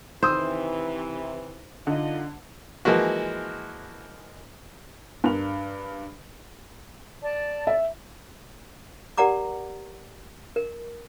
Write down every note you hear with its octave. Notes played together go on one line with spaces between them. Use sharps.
C3 D#3 E3 C5 D#6 E6
D3 D#4 F4 D#5
E3 F3 G#3 A#3 F#4
G2 A#4 F7
D5 A5
E5
G4 A#4 D5 F#5 A#5 D6
A#4